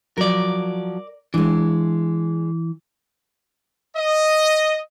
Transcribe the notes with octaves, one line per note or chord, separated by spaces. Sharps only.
F3 F#3 A#4 D5
E3 G#3 D4
D#5